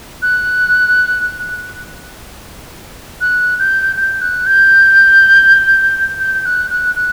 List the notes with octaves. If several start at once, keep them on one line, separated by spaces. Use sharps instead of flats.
F#6
F#6
G6
G6
F#6
G6
G6
F#6
F#6
F#6